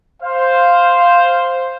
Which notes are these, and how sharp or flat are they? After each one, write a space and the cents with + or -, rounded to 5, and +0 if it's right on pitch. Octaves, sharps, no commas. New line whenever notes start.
C5 +0 F5 +0